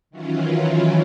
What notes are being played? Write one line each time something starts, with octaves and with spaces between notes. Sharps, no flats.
D#3 E3 F#3 C#4 E4 F4